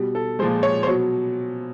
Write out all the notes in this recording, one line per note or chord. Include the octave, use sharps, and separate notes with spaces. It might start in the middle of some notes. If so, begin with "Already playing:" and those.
Already playing: B2 G3
A4
A#2 F3 G#3 C5
C#5
C5
B2 F#3 C#5